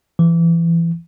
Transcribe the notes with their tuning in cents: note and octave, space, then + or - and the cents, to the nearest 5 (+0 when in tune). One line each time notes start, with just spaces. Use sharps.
E3 +25